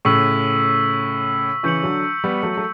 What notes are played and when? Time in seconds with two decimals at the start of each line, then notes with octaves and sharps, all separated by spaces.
0.05 A2 C#3 C#6 E6 B6
1.63 C#3 E3 C#6 G6 C#7 F#7
1.83 D3 F#3
2.24 G3 B3
2.43 F#3 A3
2.57 A3